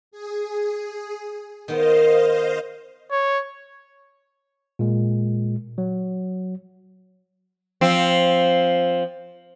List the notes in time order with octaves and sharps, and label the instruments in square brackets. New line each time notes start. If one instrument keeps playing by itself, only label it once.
[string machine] G#4
[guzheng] D#3 B3 [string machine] C5 D#5 F5
[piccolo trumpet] C#5
[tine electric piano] A#2 G#3
F#3
[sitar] F3 C4